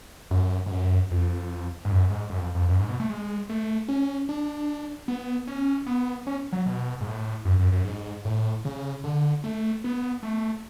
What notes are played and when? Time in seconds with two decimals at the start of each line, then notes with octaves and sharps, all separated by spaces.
0.31 F#2
0.66 G#2
0.70 F#2
1.11 F2
1.85 G#2
1.91 F#2
2.10 G#2
2.30 F#2
2.39 F2
2.55 F2
2.69 F#2
2.79 G#2
2.89 B2
3.00 A3
3.10 G#3
3.49 A3
3.88 C#4
4.29 D4
5.08 B3
5.47 C#4
5.86 B3
6.27 C#4
6.52 F#3
6.66 B2
7.01 G#2
7.06 A2
7.45 F#2
7.59 F#2
7.72 F#2
7.85 G#2
8.25 A2
8.65 C#3
9.04 D3
9.44 A3
9.84 B3
10.23 A3